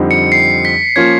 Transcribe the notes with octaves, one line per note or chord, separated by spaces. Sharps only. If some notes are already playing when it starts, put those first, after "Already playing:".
Already playing: F2 D3 G3 C4 D#4
C#7
C7
B6
F3 A#3 C#4 F4 G#6